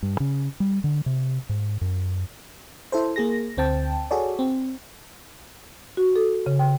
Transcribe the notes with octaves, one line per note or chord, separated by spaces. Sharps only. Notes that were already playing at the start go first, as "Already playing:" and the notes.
G2
C#3
G3
D3
C3
G#2
F#2
E4 A4 C5
A#3 G#4 A#6
D2 C4 G5 A5
F#4 G#4 A4 C#5 D5
C4
F#4
A4
C#3
G5